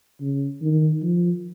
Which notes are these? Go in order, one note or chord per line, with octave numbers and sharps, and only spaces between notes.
C#3
D#3
F3